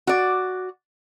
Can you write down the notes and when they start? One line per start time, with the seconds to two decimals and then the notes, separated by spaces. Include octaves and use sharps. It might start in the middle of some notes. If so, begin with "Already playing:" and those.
0.07 F#4 D5